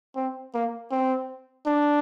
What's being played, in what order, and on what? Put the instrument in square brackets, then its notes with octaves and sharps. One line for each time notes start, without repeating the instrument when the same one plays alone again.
[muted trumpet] C4
A#3
C4
D4